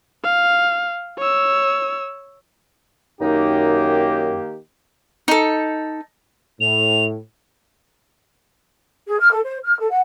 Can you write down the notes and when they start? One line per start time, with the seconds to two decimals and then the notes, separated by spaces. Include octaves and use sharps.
0.24 F5
1.18 C#5 E6
3.21 F#2 D#3 A#3 D#4 G4
5.28 D#4 A4
6.61 A2 F7
9.06 G#4
9.19 F6
9.32 A4
9.44 C5
9.63 F6
9.79 A4
9.90 F#5